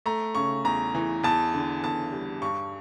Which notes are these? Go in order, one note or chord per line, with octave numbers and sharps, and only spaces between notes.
A3 A#5
C#3 C#6
E2 A#5
E3
E2 A5
D3
E2 A5
G3
G2 C#6